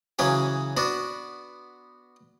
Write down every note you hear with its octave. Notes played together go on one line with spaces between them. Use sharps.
C#3 E3 F#3 C#4 G#4
B3 D4 F#4